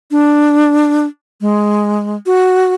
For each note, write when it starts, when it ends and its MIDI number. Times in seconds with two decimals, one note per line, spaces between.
0.11 1.06 62
1.41 2.16 56
2.26 2.74 66